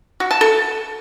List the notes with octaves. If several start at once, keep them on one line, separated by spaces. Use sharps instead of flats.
F#4
A5
A4